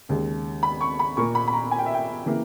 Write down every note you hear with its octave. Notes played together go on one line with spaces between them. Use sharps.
D#2 C#3 G#3
B5
C#6
B5
A#2 A#3 C#6
B5
B5
A#5
G#5
G5
E5
G5
C#3 E3 A#3